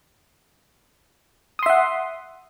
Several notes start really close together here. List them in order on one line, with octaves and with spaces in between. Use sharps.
D#6 C6 E5 F#5